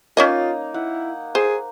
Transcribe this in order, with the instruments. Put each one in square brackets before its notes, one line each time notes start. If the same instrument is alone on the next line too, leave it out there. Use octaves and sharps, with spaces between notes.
[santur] A#3 D#4 [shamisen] C#4 C#5 D#5 [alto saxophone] F4
[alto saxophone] E4 [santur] F#5
[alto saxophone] G#4 [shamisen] C5